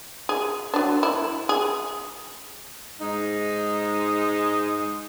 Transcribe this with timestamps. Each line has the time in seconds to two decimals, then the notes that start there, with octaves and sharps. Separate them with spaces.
0.29 G#4
0.74 F#3 D4
1.03 E4
1.49 G#4
3.01 G#2 G#3 D#4